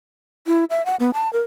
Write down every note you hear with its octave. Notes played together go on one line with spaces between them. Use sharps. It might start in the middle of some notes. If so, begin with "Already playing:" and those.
E4
E5
F#5
B3
A5
A#4